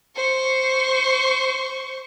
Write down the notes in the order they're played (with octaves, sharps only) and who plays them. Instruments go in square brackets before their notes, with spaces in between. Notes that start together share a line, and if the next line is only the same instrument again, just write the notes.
[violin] C5 C#6